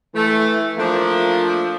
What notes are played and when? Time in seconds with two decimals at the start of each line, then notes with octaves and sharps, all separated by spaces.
0.15 E3 A3
0.78 F3 A3 A#3 D4